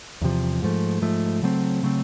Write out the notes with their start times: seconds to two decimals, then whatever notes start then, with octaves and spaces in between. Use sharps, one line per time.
0.22 E2 C3 F3
0.62 G#2 F3 A3
1.02 G#2 F3 A3
1.42 C#3 F#3 A3 C4
1.83 C#3 F#3 A3 C4